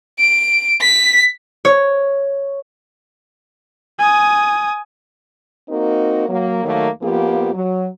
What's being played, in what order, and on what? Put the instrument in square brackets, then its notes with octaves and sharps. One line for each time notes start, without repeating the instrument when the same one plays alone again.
[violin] D7
B6
[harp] C#5
[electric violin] G#5 D#6
[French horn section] A#3 C4 D#4 F#4 A#4
F#3 A#3
D#2 D#3 F#3 A3 A#3
F2 F3 A#3 B3 F4 G4
F#3